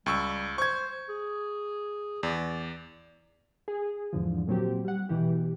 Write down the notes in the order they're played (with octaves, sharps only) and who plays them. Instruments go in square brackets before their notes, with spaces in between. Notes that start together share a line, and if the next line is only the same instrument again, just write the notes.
[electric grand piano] C#2 C#6 E6 [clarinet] G3
[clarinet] C5 [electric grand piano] C#6 G#6
[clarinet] G#4
[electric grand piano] E2 [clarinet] D5
[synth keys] G#4
E2 G#2 D3 F3
A#2 F#3 C4 G4
G3 F#5
B2 E3 G4